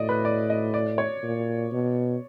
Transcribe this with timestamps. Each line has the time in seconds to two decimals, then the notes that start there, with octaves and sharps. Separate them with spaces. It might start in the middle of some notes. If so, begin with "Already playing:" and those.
Already playing: A2 D5 D#5
0.09 B4
0.25 D5
0.50 D#5
0.74 D5
0.98 C#5
1.23 A#2
1.72 B2